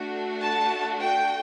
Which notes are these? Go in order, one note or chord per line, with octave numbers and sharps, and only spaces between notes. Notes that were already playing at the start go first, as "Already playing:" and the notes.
Already playing: A3 D4 F#4
A5
G5